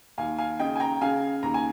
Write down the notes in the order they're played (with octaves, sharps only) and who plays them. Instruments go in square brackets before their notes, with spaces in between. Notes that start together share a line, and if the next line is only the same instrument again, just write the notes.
[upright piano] D#2 F5 G#5
F5 G#5
C#3 D#5 G5
G#5
G5 A#5
C#3 F5 G#5
D#2 A#5
G#5